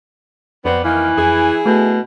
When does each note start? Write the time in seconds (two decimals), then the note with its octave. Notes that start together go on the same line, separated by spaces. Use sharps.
0.65 F2 F#3 B3 C4 D5
0.84 C3 D#3 E3 A#3
1.18 F2 E4 G#4
1.66 B2 A3